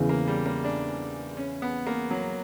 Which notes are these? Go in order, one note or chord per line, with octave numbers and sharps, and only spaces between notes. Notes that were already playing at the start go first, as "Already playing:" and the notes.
Already playing: E2 C#3 E3
A#3
G3
A#3
D4
C#4
B3
A#3
F#3